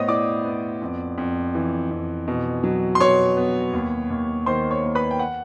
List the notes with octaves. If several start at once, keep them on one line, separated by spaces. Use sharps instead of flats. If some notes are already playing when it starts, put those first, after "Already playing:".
Already playing: A2 B3 C5 C#5 D#5 D#6
E4 D5 D6
B3
F2
F2
E3
F2
B2
F#3
C6
B2 C#5 C#6
B3
D#2
D#2
D#3 C5 C6
C#5 C#6
A#3
B4 B5
G5
F#5